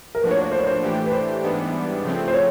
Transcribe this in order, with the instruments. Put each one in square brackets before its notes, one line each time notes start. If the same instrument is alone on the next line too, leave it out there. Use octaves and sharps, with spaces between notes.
[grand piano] A#4
[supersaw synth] A2 F3 A#3 D4 F#4 [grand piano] B4
[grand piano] C#5
C#5
C5
C#5
C5
[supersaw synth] A2 E3 A3 D4 G4
[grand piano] B4
C5
[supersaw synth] G#2 E3 G3 B3 D4
C#3 F3 A3 C4
[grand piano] C5
C#5